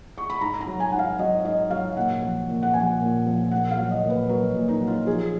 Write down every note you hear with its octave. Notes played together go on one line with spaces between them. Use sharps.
C#6
B5
G#2 A#5
A#5
F#3
G#5
G#2 F#5
F5
F#3 D#5
G#2 D#5
F#3 F5
A#2 F#5
F3
A#2
F#5
F3 G#5
A#2
F3
A#2 F#5
F5
F#3
D#5
A#2
B4
F#3 A#4
A#2
D#4
F#3
F4
F3 G#4